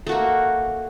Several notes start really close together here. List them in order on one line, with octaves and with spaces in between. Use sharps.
A3 F#4 A#3